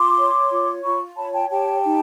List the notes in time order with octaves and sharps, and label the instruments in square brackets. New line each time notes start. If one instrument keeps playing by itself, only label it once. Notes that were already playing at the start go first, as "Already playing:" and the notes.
Already playing: [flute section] F4 C6 D6
C#5
F4
F4 B5 C#6
C#5 A5 B5
G5 A5
G4 G5 A5
D#4